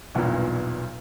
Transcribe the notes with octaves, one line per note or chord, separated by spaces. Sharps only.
B1 E2 G2 A#2